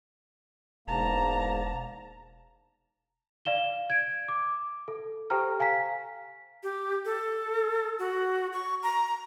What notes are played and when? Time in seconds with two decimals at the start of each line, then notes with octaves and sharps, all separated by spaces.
0.88 E1 E2 G#2 A#3 A5 A#5
3.45 D5 F5 E7 G7
3.90 G#6 D7
4.28 D6
4.88 A4
5.30 G4 A4 C5 G5 A#5 F6
5.60 F5 G#5 A#5 B6
6.63 G4
7.05 A4
7.99 F#4
8.53 C#6
8.83 A#5